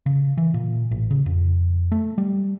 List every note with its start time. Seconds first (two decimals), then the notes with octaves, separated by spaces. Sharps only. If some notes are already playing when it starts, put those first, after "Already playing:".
0.06 C#3
0.37 E3
0.54 A#2
0.91 A1
1.11 C#3
1.26 F2
1.92 A3
2.18 G3